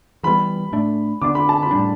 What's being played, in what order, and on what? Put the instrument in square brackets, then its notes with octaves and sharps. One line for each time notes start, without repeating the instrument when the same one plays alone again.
[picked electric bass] E3 G3 B3 [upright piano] B5
[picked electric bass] A2 A3 D4
[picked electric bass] D3 B3 D4 [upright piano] D6
[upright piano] B5
A5
B5
[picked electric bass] A2 G3 D4